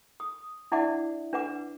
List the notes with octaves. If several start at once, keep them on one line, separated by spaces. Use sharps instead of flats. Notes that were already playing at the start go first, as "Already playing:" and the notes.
D#6
D4 E4 D5 E5 F#5 D6
D4 B4 F#5 D6